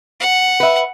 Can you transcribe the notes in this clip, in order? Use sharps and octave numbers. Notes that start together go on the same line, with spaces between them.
F#5
B4 E5